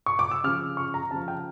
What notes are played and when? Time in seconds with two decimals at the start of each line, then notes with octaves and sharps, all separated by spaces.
0.06 C#6
0.19 D6
0.31 E6
0.44 C#3 F3 F6
0.77 C#6
0.94 A#5
1.11 C#3 F3 A5
1.28 G5